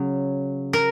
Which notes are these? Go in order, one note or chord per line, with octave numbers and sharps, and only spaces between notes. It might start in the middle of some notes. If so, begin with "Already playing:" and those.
Already playing: C#3 F#3
A#4